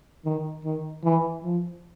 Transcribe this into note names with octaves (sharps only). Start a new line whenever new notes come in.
D#3
D#3
E3
F3